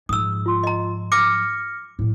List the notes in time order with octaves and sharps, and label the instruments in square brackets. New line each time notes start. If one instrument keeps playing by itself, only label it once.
[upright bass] G#2 F3 [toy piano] D#6 E6
[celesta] F4 C6
[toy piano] D#5 A#5
[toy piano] D6 [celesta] F6 A#6 C#7
[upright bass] A2 F#3